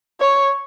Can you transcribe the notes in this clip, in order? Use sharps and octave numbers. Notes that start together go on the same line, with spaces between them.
C#5